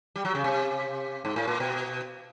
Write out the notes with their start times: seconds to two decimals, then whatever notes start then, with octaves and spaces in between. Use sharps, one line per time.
0.16 G3
0.25 F#3
0.35 C#3
0.44 C3
1.25 G#2
1.36 A2
1.48 A#2
1.60 B2